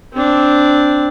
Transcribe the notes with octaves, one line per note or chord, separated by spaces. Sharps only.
C4 D4